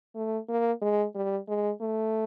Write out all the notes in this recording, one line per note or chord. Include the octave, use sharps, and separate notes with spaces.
A3
A#3
G#3
G3
G#3
A3